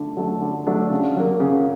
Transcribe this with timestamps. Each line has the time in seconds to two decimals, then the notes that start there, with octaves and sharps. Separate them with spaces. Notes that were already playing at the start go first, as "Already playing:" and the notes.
Already playing: D3 A3
0.17 F#3 A3 D4
0.42 D3
0.67 F#3 A3 D4
0.90 C#3
1.16 F#3 A#3
1.40 C#3